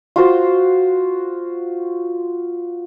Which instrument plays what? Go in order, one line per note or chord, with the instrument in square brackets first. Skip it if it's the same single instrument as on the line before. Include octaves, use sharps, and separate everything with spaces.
[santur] F4 F#4 C5